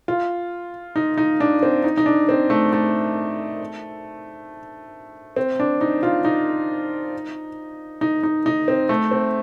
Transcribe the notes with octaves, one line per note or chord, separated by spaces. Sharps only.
F4
D#4
D#4
D4
C4
D#4
D#4
D4
C4
A3
A3
C4
D4
D#4
F4
D#4
D#4
D#4
D#4
C4
A3
C4